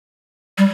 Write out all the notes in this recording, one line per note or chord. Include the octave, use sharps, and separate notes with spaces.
G3